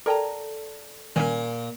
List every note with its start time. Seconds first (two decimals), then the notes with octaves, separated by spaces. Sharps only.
0.06 A4 A#4 D5 G5 A5 A#5
1.16 A#2 D#3 G3 C#4 G#5